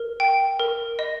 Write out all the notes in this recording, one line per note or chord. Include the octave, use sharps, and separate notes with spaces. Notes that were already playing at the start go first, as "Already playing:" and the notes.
Already playing: A#4
G5
A#4
D#5